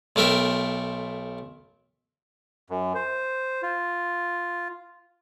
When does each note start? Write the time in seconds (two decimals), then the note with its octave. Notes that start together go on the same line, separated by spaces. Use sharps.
0.16 B1 A3 A#4 E5 G5
2.70 F#2
2.95 C5
3.62 F4